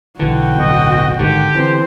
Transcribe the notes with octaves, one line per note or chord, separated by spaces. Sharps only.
B1 D3 E3 F#4 G5
D1 B1 D#5
G#1 G#2 D3 D#3 G4
E3 C4 C5